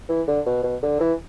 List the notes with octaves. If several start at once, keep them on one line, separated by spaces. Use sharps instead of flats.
E3
D3
B2
B2
D3
E3